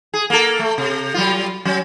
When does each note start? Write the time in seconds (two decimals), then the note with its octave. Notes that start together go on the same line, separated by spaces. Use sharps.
0.14 G#4
0.30 A#3 A4
0.59 A3
0.78 C3
1.14 F#3 G3 F4
1.65 F#3 C#4